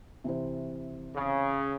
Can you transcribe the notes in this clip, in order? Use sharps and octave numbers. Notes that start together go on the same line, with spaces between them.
C3 E3 C5
C#3